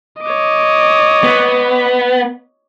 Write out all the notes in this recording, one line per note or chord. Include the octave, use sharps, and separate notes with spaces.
C#5 D#5 D6
B3